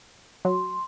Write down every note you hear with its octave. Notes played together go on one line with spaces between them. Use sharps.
F#3 C6